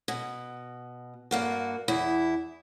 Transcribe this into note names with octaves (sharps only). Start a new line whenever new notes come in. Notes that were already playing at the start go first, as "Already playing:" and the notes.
B2
G2 A#3 F#4
E2 E4